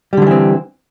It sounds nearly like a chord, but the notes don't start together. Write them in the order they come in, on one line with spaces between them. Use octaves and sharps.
G3 D3 F#3 E3 C4